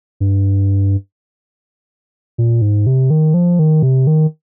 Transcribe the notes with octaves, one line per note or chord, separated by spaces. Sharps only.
G2
A#2
G#2
C3
D#3
F3
D#3
C3
D#3